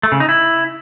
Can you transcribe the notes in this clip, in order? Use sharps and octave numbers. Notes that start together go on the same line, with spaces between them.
A3
C#3
D#4
E4